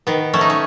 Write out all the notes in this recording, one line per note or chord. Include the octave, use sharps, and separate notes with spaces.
D#3 B3
A3 C#4
D#4
C#4